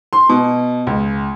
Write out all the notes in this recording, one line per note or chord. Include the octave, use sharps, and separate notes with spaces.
C6
B2
C#2